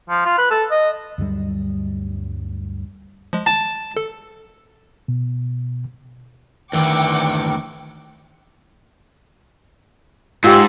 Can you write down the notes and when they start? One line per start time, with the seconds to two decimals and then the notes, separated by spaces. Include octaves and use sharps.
0.09 F3
0.25 F4
0.38 B4
0.51 A4
0.71 D#5
1.18 D2 G2 F#3 G3
3.33 F3 G#3
3.46 A5
3.97 A4
5.08 B2
6.73 D2 D#3 E3 G5 C#6 D6
10.44 G#2 F4 G4 E6